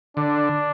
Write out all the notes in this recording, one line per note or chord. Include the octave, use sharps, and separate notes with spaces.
D3 D4